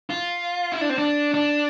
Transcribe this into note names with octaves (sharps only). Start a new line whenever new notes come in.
F4
E4
D4
C4
D4
D4